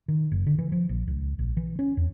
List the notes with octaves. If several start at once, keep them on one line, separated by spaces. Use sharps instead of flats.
D#3
F#1
D3
E3
F3
A#1
C#2
A#1
E3
C#4
E2